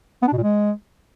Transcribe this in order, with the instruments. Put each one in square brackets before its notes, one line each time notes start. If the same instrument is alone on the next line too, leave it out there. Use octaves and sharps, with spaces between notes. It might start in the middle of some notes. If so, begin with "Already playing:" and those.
[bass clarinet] B3
D4
B2
A#2
G#3